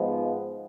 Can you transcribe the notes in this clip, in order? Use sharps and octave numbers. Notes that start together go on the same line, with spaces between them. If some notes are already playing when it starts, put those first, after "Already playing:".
Already playing: G#2 F3 G#3 B3